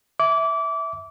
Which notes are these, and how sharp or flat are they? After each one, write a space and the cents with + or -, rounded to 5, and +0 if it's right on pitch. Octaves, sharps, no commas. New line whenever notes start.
E5 -10 D6 -25